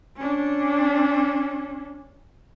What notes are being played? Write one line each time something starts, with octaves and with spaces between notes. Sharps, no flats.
C#4 D4